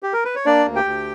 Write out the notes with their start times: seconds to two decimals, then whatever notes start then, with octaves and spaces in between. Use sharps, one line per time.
0.03 G4
0.13 A#4
0.25 B4
0.35 C#5
0.46 A#3 D4 D5
0.66 D2
0.76 G4 G5
0.85 D2